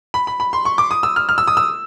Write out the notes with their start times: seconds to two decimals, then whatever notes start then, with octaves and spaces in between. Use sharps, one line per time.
0.14 B5
0.27 B5
0.40 B5
0.53 C6
0.65 C#6
0.78 D6
0.91 D#6
1.03 E6
1.16 F6
1.29 F6
1.38 E6
1.47 D#6
1.57 E6